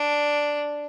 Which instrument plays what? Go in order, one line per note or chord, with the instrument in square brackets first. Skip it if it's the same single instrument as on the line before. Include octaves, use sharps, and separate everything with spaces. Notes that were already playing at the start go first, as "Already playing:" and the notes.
Already playing: [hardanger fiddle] D4